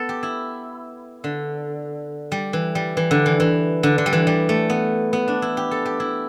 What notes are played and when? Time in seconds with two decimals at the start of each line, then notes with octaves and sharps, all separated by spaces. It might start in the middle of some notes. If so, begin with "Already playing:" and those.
Already playing: B3 A4
0.09 G4
0.23 E4
1.24 D3
2.32 G3
2.53 E3
2.75 G3
2.97 E3
3.11 D3
3.26 E3
3.40 E3
3.83 D3
3.98 D3
4.06 G3
4.13 E3
4.27 G3
4.49 A3
4.70 B3
5.13 B3
5.28 D4
5.42 E4
5.57 G4
5.71 A4
5.85 G4
6.00 E4